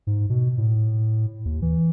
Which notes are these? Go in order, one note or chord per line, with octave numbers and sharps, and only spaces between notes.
G#2
B2
A2
D#2
E3